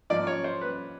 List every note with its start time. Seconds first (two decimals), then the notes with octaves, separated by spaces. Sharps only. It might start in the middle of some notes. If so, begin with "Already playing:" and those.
0.10 G#2 F3 A#3 D5
0.27 C#5
0.44 C5
0.61 B4